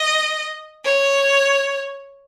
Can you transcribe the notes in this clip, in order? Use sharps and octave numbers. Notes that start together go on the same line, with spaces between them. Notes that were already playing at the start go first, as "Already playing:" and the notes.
Already playing: D#5
C#5